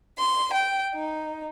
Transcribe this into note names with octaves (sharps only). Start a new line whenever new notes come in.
C6
G5
D#4